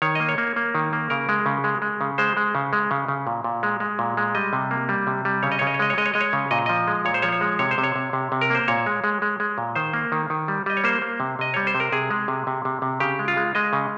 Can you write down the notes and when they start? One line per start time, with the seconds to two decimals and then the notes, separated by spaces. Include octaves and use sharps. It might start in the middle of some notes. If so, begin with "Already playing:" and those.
0.02 D#3 C#5
0.15 A#3 D#5
0.29 C#5
0.38 A#3
0.56 A#3
0.75 D#3
0.93 A#3
1.10 C#3 A#4
1.29 G#3
1.46 C#3
1.64 G#3
1.82 G#3
2.01 C#3
2.18 G#3 C5
2.37 G#3
2.55 C#3
2.73 G#3
2.91 C#3
3.08 C#3
3.27 A#2
3.44 A#2
3.63 G#3
3.80 G#3
3.99 A#2
4.17 G#3
4.35 G3 D#5
4.53 C3
4.71 A#3
4.89 G3
5.07 C3
5.25 G3
5.43 C#3 C#5
5.52 D#5
5.59 C#3 C#5
5.67 D#5
5.74 C#5
5.79 G#3 D#5
5.90 C#5
5.98 G#3 D#5
6.06 C#5
6.14 G#3 D#5
6.21 C#5
6.33 C#3
6.51 A#2 D#5
6.66 F3 D#5
6.88 G#3
7.05 A#2 C#5
7.14 C5
7.22 F3 C#5
7.32 C#5
7.41 G#3
7.59 C3 C#5
7.71 C5
7.78 C3
7.83 C#5
7.96 C3
8.13 C3
8.32 C3
8.41 A#4
8.50 A#3 C5
8.68 A#2 C#5
8.86 G#3
9.04 G#3
9.22 G#3
9.40 G#3
9.58 A#2
9.75 D#3 C5
9.93 A#3
10.12 D#3
10.30 D#3
10.48 G3
10.66 G3 D#5
10.77 C#5
10.84 A#3 C5
11.02 A#3
11.20 C3
11.39 C3 D#5
11.54 G3 C#5
11.67 C5
11.75 C3
11.80 A#4
11.92 C3 G#4
12.11 G#3
12.28 C3
12.47 C3
12.65 C3
12.82 C3
13.00 C#3 G4
13.19 G#3
13.28 F4
13.37 G#3
13.55 G#3 D#5
13.73 C#3